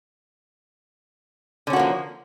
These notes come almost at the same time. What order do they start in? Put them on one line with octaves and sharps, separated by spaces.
D3 C#4 F#4 A#3 F3